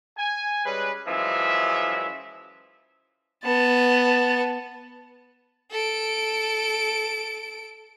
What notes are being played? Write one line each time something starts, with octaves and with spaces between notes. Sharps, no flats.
G#5
G3 G#3 C#4 B4
F#2 E3 F3 G#3 E5
B3 A5
A4 D7